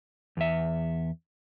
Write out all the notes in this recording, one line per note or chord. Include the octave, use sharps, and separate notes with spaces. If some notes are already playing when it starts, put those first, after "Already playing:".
E2 E5